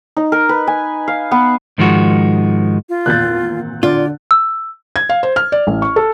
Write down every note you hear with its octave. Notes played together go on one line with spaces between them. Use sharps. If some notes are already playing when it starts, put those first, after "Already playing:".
D#4
A#4
B4
G#5
F5
B3
G#2 D#3 F3 G#3 F#4
F4
G#1 E2 A#2 F#6 G6 A6
D3 F4 D5
E6
G#6
F5
C5
F6
D5
A1
C#6
A4